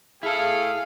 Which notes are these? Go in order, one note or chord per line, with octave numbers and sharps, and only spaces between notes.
E4 G#4 A4 F5